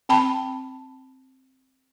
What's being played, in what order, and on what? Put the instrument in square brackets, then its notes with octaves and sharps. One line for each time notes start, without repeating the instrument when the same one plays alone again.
[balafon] C4 G5 A5 B5